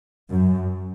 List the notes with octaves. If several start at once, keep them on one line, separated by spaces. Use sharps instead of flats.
F#2